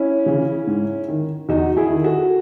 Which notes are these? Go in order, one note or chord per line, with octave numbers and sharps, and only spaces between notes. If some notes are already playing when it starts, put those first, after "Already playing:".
Already playing: C#4 E4
C#3 E3
G#2
D#3
E2 D#4 F#4
E4 G#4
D#3
F#4 A4